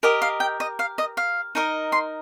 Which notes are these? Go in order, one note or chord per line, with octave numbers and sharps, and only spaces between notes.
G4 A#4 D#5
F5
G5
D#5
F5
D#5
F5
D#4 A#4 D#5
C6